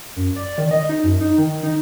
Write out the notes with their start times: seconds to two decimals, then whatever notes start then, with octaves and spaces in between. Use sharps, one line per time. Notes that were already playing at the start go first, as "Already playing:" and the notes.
0.16 F#2
0.36 D5
0.58 D#3
0.71 D#5
0.89 D#4
1.04 F#2
1.20 D#4
1.38 D#3
1.63 D#4